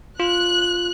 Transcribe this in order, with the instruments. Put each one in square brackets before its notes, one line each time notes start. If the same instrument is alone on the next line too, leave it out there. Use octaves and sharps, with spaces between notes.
[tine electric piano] F4 [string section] F#6